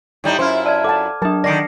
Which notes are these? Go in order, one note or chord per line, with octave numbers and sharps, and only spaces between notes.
A2 G3 D#4
F#2 E4 F4 C5 C6 F6
D5 A5 F6 G#6
A4 F#5 A5 D6
F#3 D4 A#4 A5
D3 D#3 D5 D#5 D6 A#6 C7 C#7